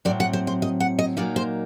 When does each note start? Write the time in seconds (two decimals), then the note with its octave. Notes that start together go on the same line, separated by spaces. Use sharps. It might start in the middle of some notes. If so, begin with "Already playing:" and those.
0.05 A2 F#3 C4 D5
0.20 F#5
0.33 C5
0.47 C5
0.62 D#5
0.80 F#5
0.99 D#5
1.17 A#2 F#3 A#3 D#4 D5
1.36 C5